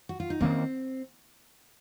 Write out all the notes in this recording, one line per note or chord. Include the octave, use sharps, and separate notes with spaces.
F#4
F4
D#4
D#3 A#3 C4 C#4